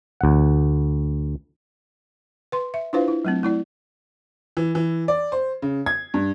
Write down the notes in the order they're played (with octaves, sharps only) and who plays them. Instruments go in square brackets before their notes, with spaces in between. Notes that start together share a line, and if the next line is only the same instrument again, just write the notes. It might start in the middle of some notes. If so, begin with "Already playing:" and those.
[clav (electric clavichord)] D2 F#5
[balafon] B4 C6
E5
D4 E4 F4 B4 C5 F5
E4
F#3 A3 C4
A3 E4 D5
[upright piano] E3
E3
D5
C5
C#3
G#6
G2